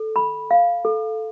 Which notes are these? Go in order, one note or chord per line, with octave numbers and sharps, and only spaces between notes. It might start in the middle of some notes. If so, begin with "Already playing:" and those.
Already playing: A4
B5
F5
A4